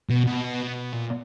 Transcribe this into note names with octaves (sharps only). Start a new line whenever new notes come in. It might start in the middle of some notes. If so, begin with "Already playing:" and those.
B2
B2
A#2